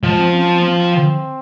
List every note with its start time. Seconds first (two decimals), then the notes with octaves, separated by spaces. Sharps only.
0.03 F3 G#3
0.19 C4
0.34 C#4
0.50 C4
0.60 A#3
0.66 C4